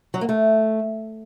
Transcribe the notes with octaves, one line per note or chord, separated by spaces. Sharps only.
F#3
A#3
A3